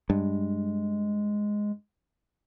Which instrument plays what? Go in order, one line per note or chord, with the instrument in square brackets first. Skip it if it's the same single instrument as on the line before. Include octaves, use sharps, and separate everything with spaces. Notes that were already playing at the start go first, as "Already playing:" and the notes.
[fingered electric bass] G2 [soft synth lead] G#3